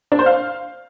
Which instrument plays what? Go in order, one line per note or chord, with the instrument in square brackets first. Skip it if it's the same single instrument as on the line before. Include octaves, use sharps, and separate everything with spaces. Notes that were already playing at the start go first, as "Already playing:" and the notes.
[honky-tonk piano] D4
C5
F5